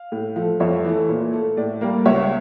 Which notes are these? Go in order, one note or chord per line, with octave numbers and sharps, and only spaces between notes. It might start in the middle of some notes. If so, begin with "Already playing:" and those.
Already playing: F5
A2
F3 A3
F2 C#5 E5
E3 A3
A#2
A3
A2 D5
G3 A#3
C#2 C#5 E5